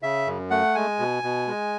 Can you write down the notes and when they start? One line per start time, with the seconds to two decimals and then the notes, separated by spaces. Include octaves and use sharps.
0.02 C#3 E5
0.27 F#2
0.50 A3 F#5
0.75 G#3 G#5
0.99 B2
1.23 B2
1.47 G#3